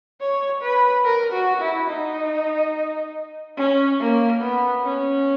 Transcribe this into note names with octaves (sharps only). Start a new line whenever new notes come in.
C#5
B4
A#4
F#4
E4
D#4
C#4
A#3
B3
C#4